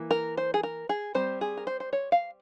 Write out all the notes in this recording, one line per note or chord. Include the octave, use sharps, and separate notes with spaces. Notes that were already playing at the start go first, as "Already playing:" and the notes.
Already playing: E3 A#3
A#4
C5
G#4
A#4
G#4
G3 C4 C5
G#4
A#4
C5
C5
C#5
F5